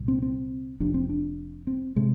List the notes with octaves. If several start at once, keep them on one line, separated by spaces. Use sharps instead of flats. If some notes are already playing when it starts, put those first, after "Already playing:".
Already playing: C2 A#2
C4
C4
F1 F2 C3 D4
C4
D4
C4
C3 G#3